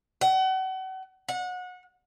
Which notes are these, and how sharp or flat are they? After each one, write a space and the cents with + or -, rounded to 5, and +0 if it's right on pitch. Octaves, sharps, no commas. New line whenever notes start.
F#5 +35
F#5 -25